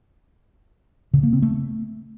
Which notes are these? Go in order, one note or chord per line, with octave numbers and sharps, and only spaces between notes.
C#3
A#3
C4
A3